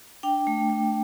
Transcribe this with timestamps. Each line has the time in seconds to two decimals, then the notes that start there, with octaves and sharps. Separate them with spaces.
0.23 D4 G5
0.47 A3
0.70 A3